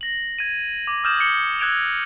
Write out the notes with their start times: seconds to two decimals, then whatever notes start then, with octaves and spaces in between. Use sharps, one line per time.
0.01 A#6 F#7
0.39 G#6 D#7
0.87 D6
1.04 D#6 F6 G6 E7 F#7
1.19 D6 G6 C#7 G7
1.60 E6 F#6 G#6 D7 E7 F7